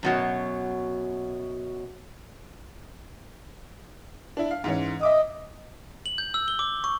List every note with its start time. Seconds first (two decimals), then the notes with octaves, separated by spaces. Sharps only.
0.03 F#2 B2 F#3
4.37 D4 E4
4.51 F5
4.64 G#2 E3 C#4
5.01 D#5 E5 D6 D#6
6.06 F#7
6.18 G6
6.34 E6
6.48 G7
6.59 D6
6.84 C#6